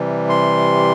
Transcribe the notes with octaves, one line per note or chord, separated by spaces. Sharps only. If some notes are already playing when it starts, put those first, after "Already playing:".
Already playing: C3 E3 G3
C6